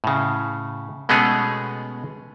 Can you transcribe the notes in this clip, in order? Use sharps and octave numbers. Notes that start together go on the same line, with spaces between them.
A2 C#3
B2 G#3 A3 B3 C#4 G#4